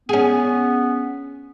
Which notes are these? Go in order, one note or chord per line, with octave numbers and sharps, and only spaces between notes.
B3 C#4 G#4